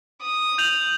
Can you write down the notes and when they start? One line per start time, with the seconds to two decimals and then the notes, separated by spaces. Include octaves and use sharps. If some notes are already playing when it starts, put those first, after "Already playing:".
0.21 D#6
0.58 G6 F7 F#7